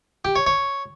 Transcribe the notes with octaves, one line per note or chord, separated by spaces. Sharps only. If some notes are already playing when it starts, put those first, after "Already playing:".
G4
C#5
C#5